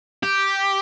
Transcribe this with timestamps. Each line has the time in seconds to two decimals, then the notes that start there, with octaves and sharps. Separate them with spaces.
0.23 G4